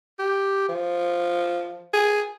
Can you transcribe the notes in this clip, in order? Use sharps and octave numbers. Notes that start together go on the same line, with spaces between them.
G4
F3
G#4